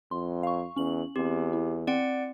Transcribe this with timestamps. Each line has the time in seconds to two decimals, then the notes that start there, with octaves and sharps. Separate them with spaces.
0.11 F2 C6
0.43 F5 C#6
0.76 E2 C#4 F#7
1.16 E2 C4 G4
1.53 E4
1.87 C4 D5 F#5 D7